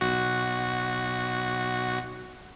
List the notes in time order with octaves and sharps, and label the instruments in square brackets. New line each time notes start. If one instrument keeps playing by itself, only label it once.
[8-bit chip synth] B1 F#4